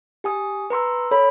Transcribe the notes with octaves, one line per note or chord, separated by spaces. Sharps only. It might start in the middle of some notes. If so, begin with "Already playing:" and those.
G4 G#5 D#6
B4 A#5 C6 E6
A4 C#5 B5